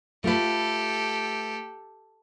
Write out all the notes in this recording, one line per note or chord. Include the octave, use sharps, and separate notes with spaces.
A3 F4 G4 A4 B4